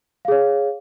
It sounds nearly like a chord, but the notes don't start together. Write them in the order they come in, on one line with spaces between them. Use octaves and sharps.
F5 G#4 C#5